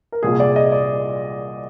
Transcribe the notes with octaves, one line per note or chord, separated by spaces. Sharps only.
A#4
C2 A#2 G3 G#4
D5
D#5
D5